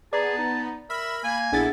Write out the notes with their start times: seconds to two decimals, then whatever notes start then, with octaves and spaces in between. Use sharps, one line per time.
0.13 B3 G#4 D5 A5 A#5
0.38 D#4
0.90 A#4 E5 B5
1.24 A#3 G#5
1.52 A#1 B3 D4 E4 G#4 A4 A6